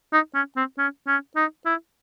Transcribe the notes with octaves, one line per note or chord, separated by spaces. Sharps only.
D#4
C#4
C4
C#4
C#4
D#4
E4